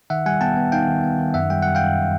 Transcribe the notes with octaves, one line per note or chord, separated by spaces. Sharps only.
D#3 E5 F#5
G3 F#5 G#5
B3 G5 A5
B3
D#4 F5 G5
D#3
B3
D#3
F#2 E5 F#5
G3 G5
G3 F#5
F5 G5
F#2